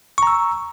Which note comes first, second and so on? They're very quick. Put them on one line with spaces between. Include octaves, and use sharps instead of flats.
C#6 A#5 E6